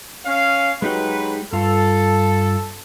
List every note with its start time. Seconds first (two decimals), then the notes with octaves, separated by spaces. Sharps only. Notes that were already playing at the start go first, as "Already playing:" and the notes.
0.24 C#4 F5
0.82 F#3 G#3 D#4 G4 B4
1.53 G2 F4 A4